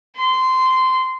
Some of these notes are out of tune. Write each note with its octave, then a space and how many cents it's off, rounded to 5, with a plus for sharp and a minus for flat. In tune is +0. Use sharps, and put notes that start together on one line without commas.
C6 -15